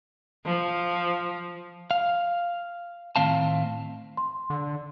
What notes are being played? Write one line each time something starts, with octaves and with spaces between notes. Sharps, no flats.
F3
F5
A2 D#3 C4 F5 A5
C6
D3